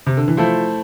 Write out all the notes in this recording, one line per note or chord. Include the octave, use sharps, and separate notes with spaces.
C3
D3
E3
F3 A3 E4 A4 C5